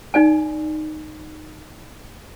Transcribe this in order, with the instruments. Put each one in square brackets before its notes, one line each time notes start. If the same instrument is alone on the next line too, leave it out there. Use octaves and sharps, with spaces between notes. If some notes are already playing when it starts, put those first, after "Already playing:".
[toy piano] D#4 D5 G#5